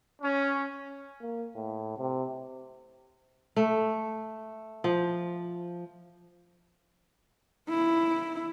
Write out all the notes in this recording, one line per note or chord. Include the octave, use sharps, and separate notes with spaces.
C#4
A#3
A2
C3
A3
F3
E4